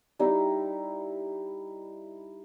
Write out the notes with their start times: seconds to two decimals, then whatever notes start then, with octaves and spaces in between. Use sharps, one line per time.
0.19 G3 D#4 E4